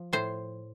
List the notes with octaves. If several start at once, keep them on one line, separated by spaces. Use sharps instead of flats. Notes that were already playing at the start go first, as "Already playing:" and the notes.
Already playing: F3
A2 C5